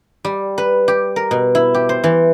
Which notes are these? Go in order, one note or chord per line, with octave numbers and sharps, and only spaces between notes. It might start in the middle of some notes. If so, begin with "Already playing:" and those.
G3
B4
G4
A#4
B2
E4
G4
C5
E3